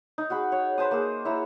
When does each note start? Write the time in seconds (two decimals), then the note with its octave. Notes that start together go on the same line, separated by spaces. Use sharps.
0.18 D#4
0.30 F#4 G#4 B5
0.52 C#5
0.78 B4 C5 A5 D#6
0.91 A#3 G#4
1.25 E4 C#5 A#5 E6